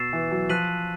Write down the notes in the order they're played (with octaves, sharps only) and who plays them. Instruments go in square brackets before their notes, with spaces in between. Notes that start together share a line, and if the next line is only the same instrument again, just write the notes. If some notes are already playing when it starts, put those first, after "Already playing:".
Already playing: [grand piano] B2 [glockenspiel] C#6 E6 A6 C7 E7
[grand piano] E3
F#3
[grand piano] F3 [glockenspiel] F#6 B6 D#7 F#7